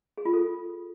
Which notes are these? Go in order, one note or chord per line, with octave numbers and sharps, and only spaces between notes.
G#4
F4
A4